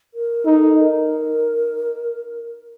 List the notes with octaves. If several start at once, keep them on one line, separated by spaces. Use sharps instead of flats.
A#4
D#4 A4
A#4